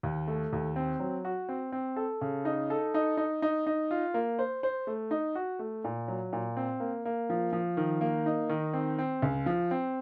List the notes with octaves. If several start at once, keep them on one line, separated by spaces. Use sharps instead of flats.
D#2
A3
D#2
C4
F#3
F#4
C4
C4
A4
C#3
D#4
A4
D#4
D#4
D#4
D#4
F4
A#3
C5
C5
A3
D#4
F#4
A3
A#2
F#3
A#2
C4
A#3
A#3
F3
F3
D#3
A#3
D#4
D#3
C4
C4
C#2
F3
C4